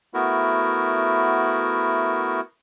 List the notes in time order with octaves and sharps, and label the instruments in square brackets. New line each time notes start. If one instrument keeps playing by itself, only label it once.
[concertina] A3 B3 E4 F#4 A#4